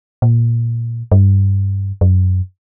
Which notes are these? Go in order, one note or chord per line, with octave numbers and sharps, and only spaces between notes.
A#2
G2
F#2